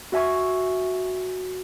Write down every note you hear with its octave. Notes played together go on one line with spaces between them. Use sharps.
F#4 E5 G#5 C#6